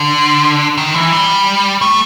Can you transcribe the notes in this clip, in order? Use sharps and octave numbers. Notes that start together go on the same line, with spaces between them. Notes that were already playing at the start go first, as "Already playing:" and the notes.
Already playing: D3
D#3
E3
G3
A3